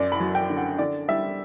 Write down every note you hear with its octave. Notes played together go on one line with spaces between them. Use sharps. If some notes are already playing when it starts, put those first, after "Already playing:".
Already playing: F#2 D5
B5
F#3
G5
D3
F#5
D3 D5
G3 E5